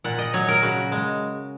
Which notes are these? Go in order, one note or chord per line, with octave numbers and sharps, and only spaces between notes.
A#2 F#5
D#5
F#3 C#5
A#4
C#3 F#4
G#3